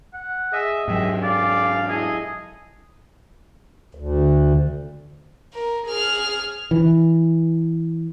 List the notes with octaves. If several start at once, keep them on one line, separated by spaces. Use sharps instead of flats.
F#5
G#4 D#5 E5
G#2 F#3 G4 G#4 E5
G#4 D5 F5
E4 G#4 A4 D#5
D2
A#4
G#4 F6
E3